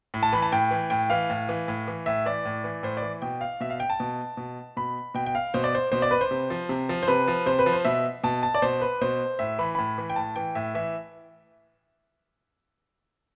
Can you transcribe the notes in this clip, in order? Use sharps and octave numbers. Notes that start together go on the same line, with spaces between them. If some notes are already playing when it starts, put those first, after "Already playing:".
A2
A5
E3 B5
A5
A2 G5
E3
A2 G5
E3 F5
A2
E3
A2
E3
A2 E5
E3 D5
A2
E3
A2 C5
D5
E3
B2 G5
F5
B2 E5
F5
G5
A5
B2
B2
B2 B5
B2 G5
G5
F5
B2 C5
D5
C5
B2 C5
D5
B4
C5
C3
F3
C3
F3
C5
C3 B4
F3
C3 C5
B4
F3
C5
B2 E5
B2 A5
A5
D5
B2 C5
B4
B2 C5
A2 E5
E3 B5
A2 B5
E3
G5
A2 A5
E3 G5
A2 E5
E3 E5